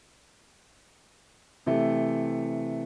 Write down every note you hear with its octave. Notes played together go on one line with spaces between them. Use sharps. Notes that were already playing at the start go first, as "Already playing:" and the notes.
C3 E3 A3